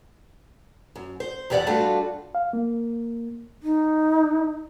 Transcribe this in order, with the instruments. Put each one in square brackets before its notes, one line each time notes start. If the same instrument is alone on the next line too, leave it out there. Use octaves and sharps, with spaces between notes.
[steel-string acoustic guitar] F#2
C5
E2 A2 G4 D5 E5 F#5
G3 A3 D4 F4 F#4 A4
[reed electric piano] F5
A#3
[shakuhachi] D#4